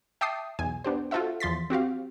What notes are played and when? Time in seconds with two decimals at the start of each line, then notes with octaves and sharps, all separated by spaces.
0.21 E5 G5 A5 D6 D#6 C7
0.59 B1 E2 G#5
0.84 B3 D4 G4 C5
1.11 F4 F#4 A4 C5 E5 F#5
1.40 E2 F3 C6 A6 B6
1.70 C4 F#4 G4 F5